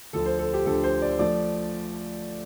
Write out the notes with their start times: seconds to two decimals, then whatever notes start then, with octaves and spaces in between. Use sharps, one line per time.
0.13 D2 D3 F3 A4
0.26 C5
0.39 A4
0.53 G4
0.66 D2 D3 F3 A4
0.84 C5
1.02 D5
1.19 F3 A3 D5